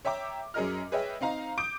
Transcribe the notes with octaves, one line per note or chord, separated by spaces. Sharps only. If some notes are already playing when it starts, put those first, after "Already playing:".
C#5 E5 G5 A#5 D6
F#2 C#4 G#4 A#4 D#5 F6
G#4 B4 C#5 D#5 E5 G5
C4 D#4 F5 A#5
D6 D#6 G6 D7